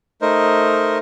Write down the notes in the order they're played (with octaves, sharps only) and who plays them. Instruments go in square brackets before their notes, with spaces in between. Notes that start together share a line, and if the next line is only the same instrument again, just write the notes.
[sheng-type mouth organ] A3 D#4 A#4 C5 D#5